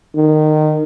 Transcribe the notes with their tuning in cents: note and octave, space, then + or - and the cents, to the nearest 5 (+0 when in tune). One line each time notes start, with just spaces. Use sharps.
D#3 -20